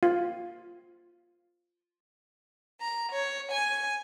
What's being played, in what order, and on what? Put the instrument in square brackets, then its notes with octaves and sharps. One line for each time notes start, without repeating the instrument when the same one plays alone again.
[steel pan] F4
[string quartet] A#5
C#5
G#5